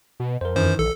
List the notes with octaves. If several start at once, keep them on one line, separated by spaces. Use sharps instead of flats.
B2
F2 A#4 C5
F#2 D#3 E3 C5
A#1 A4